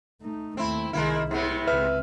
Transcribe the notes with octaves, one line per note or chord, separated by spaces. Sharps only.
A3 D#4
D#2 A3 C4 E4
C2 D#3 G#3 A#3 E4
G#2 C3 B3 E4
C#2 C4 B4 E5 F6